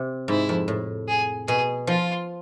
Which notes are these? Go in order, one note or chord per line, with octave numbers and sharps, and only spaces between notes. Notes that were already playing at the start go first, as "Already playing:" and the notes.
Already playing: C3
G#2 E4
F2
A2
G#4
B2 G#4
F3 F4